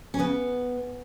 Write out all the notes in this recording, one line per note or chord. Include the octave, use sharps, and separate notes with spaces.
C#4
C#3 B3